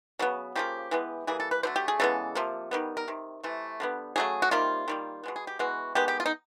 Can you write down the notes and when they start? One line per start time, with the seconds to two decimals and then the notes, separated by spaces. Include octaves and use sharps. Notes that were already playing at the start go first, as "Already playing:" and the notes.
0.19 C#3 F#3 B3
0.56 C#3 F3 A#3 G4
0.91 E3 G#3 B3
1.27 E3 G3 A#3 G#4
1.40 A4
1.51 B4
1.63 D3 F#3 A3 C5
1.76 G4
1.88 G#4
2.00 C#3 E3 G#3 B3 A4
2.35 C3 F3 A#3
2.71 D#3 G3 B3
2.97 A#4
3.08 C3 D#3
3.43 C3 E3 A3
3.80 D3 G3 B3
4.16 C#3 F#3 A3 G#4
4.42 F#4
4.51 C3 D#3 G3 A#3 F4
4.88 D#3 G3 A#3
5.23 B2 G#3 B3
5.36 G#4
5.47 G4
5.59 E3 G#3 B3 F#4
5.95 D#3 G#3 B3 G4
6.08 G4
6.20 F4
6.26 D#4